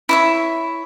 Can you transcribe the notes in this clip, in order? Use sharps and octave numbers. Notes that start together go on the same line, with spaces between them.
E4 C#5 E5